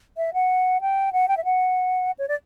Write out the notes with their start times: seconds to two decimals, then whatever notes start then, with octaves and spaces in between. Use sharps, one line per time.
0.17 E5
0.34 F#5
0.81 G5
1.13 F#5
1.28 G5
1.37 E5
1.45 F#5
2.19 C#5
2.28 D5